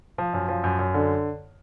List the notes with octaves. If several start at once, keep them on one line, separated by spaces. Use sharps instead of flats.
F3
F#2
F3
F#2
F#2
D3